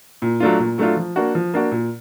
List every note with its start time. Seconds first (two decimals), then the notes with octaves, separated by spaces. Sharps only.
0.22 A#2
0.40 F#3 A3 D4 F4
0.59 A#2
0.78 F#3 A3 D4 F4
0.97 F3
1.16 A#3 D4 F#4
1.35 F3
1.54 A#3 D4 F#4
1.72 A#2